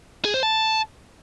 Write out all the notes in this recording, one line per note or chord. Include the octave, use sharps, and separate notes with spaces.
G#4
C5
A5